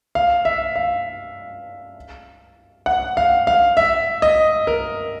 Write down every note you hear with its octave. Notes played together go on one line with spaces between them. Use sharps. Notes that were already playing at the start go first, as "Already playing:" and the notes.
F5
E5
F5
F#5
F5
F5
E5
D#5
A#4